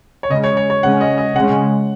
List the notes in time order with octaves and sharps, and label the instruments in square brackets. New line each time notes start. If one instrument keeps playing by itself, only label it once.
[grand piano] C#5
[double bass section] C#3 G#3 C#4 [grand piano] D#5
[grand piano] C#5
C#5
C#5
[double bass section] C#3 G#3 C#4 [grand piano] F#5
[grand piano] D#5
D#5
[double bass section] C#3 G#3 C#4 [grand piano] F#5